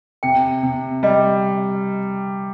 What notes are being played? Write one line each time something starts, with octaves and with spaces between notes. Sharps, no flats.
C3 G5
C3
G3 D#5